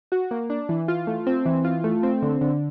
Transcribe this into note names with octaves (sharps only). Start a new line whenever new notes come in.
F#4
A#3
D4
E3
F4
A3
C4
E3
F4
A3
C4
D3
D3